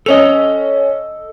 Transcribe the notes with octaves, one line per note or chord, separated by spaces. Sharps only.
C#4 A4 D#5 F7